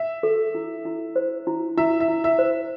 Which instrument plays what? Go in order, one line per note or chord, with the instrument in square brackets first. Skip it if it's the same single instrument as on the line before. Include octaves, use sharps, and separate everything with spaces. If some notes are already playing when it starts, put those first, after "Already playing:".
Already playing: [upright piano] E5
[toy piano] A4
E4
E4
C5
E4
[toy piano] E4 [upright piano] E5
[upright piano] E5
[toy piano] E4
[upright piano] E5
[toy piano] C5